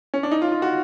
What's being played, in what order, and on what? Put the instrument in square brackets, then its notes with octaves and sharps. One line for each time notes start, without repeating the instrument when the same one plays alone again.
[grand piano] C#4
D4
D#4
F4
F4
F#4